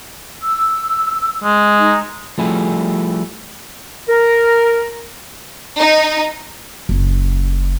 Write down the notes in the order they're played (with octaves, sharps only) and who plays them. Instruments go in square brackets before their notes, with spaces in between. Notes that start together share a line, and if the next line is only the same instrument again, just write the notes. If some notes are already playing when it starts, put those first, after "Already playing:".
[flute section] E6
[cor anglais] G#3
[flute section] D#4
[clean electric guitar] F3 G3 A3 E4 G#4
[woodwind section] A#4
[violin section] D#4
[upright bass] F#1